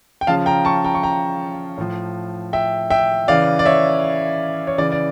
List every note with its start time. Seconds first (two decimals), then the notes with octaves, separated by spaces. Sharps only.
0.21 G5
0.27 C#3 F3 F5 A5
0.46 G5 A#5
0.65 A5 C#6
0.84 G5 A#5
0.95 C#6
1.03 G5 A#5
1.78 A2 F3
2.53 E5 G5
2.90 E5 G5
3.28 C#3 E3 D5 F5
3.59 D5
3.66 C#5 E5
4.67 C#5
4.78 C#3 E3 D5
4.92 D5